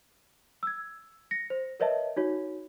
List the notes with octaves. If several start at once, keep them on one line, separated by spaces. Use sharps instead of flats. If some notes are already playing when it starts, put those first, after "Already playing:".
E6 G#6
A#6 C#7
C5
A#4 B4 C#5 D#5 E5 A5
D#4 F#4 C#5